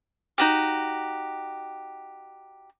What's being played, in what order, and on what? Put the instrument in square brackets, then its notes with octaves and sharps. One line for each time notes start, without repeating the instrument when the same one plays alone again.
[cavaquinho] D#4 F#4 G4